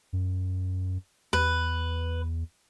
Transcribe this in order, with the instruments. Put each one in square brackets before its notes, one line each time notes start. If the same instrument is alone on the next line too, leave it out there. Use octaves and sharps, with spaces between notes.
[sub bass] F#2
[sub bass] E2 [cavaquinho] B4